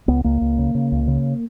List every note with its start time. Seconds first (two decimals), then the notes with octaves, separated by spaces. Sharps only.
0.08 C#2 B3
0.24 C#2 A#3
0.41 C#2
0.58 C#3
0.75 C#3
0.92 C#2
1.08 C#3